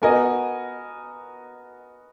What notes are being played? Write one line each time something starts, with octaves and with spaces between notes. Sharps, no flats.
B3 F#4 A#4 D#5 G#5